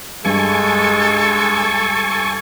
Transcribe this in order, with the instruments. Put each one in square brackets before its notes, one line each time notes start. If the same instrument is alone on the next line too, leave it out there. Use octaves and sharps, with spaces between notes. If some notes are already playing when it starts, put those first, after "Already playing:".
[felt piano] G2 [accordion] G#3 [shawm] A4 [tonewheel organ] G#5 C#6